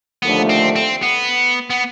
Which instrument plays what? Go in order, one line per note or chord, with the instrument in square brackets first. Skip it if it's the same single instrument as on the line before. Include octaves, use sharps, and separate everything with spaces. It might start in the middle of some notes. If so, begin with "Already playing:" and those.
[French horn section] D#2 D3 F3 A3 D4 [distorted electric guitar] B3
[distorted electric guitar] C4
C4
B3
B3